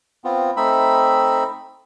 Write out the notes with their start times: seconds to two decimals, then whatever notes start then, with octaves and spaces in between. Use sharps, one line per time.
0.24 B3 C4 F4
0.57 A3 C4 D#4 E5 B5